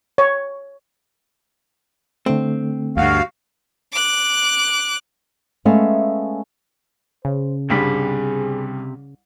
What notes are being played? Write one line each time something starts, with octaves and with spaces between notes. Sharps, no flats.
C#5
D3 A3 C4
D2 G2 F#4 F5
D6 F#6
G#3 A3 B3 C#4 E5 F5
C#3 C5
C2 G2 C3 G3 C4 G#4 B5